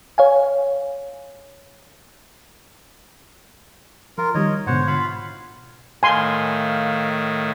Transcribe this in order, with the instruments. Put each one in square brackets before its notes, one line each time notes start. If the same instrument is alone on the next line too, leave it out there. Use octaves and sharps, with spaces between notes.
[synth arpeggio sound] C#5 F5 G#5
[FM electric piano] F3 [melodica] F4 A#4
[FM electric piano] D#3 G3 [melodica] C#5 D#5
[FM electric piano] G#2 B2 D3 [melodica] C5 C#5 F#5
[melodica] F4 F5 B5
[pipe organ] A2 D#3 [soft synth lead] F5 [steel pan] G#5 C6